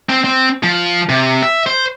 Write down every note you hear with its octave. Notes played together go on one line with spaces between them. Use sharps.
C4
C4
F3
C3
E5
C5